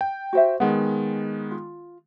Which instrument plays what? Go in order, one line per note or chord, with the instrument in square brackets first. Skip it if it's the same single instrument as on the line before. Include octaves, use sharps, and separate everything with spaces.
[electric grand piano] G5
[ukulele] F#4 C5 E5
[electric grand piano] D#3 G#3 B3 [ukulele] F#5
[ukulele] F4